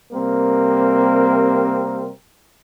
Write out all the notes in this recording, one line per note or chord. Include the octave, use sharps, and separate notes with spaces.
C3 G3 A#3 C4 A#4